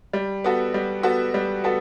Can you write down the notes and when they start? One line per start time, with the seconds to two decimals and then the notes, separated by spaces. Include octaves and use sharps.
0.13 G3
0.44 B3 F#4 A4
0.74 G3
1.03 B3 F#4 A4
1.34 G3
1.64 B3 F#4 A4